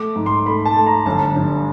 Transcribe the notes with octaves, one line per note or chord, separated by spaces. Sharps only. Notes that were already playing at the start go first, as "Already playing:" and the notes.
Already playing: A3 D6
G#2
C6
A3 B5
A5
A3
A#5
G1 A5
G2